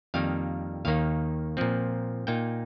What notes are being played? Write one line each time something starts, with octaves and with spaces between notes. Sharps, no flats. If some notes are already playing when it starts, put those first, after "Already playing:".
F2 D#3 G3 A#3 F5
D#2 D#3 A#3 D#4 F5
A#2 F3 C4
A#2 A#3 D#4 G5